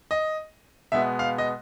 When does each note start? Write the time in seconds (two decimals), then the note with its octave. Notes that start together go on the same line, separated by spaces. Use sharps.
0.11 D#5
0.92 B2 G#3 B3 E5
1.19 F5
1.38 D#5